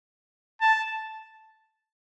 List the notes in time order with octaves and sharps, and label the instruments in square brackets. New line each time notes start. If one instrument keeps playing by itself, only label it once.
[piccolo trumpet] A5